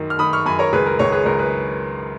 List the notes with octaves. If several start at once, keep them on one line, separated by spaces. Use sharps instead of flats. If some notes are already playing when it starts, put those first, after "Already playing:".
Already playing: F#2 D#3
F6
D#3 B5 D#6
C#6 F6
F#2 G#5 B5
A#4 C#5
C#2 G#4 B4
A#4
C#2 A#4 C#5
G#4 B4
C#2 A#4 C#5
G#4 B4